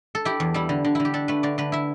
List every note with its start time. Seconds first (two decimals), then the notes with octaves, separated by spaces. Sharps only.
0.15 A4
0.25 E4 G4
0.40 E2
0.54 G3 E4
0.69 D3
0.85 D3
0.95 D3 E4
1.05 G4
1.14 D4 A4
1.28 A3 B4
1.43 D3 D5
1.58 D3 B4
1.72 E4 E5